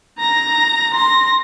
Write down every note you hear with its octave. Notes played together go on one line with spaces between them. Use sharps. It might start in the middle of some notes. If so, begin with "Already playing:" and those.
A#5 A#6
C6 A#6